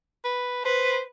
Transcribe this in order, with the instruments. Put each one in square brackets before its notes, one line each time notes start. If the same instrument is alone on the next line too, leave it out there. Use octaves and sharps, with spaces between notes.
[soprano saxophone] B4
[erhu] B4 [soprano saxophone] C5